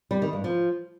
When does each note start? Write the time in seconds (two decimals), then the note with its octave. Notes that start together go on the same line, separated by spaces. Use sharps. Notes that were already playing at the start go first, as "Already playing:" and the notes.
0.11 G3
0.22 D#3
0.33 G2
0.44 F3